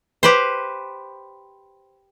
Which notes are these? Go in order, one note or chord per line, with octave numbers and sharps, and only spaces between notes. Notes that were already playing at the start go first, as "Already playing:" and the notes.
G4 B4 C5